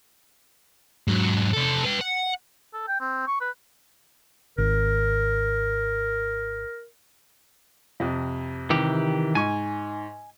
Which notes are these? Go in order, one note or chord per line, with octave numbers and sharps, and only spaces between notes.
G#2 F#3
C3 A4
B4 G5
F#5
A4
G5
C4
C#6
B4
G#1 A#4
F2 C3
C3 D#3 E3 G4
G#2 G#5 C#6